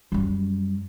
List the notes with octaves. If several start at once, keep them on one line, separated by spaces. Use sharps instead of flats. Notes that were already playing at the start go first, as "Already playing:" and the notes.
F#2 G3